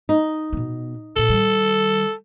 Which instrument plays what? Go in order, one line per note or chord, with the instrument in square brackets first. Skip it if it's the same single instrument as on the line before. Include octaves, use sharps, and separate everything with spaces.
[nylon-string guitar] D#4
[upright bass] B2 B3
[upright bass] A#2 B3 [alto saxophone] A4
[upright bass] D#3 G3